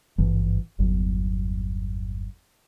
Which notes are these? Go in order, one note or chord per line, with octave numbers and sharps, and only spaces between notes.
G#1 G2 E3 F3
G1 E2 F#3